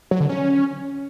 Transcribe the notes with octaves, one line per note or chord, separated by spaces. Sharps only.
F#3
D3
C#4